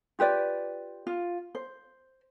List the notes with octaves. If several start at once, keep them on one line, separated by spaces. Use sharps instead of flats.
F4 G4 B4 D5
F4
C5